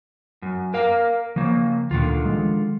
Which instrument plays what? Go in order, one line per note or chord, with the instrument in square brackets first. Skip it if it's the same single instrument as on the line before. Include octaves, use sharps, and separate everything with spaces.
[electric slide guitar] F#2
A#4 F5
[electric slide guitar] C#3 A#3 [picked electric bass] F3
[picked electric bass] D2 A#2 [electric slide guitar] D3 D#3 F4
[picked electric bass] F3 G#3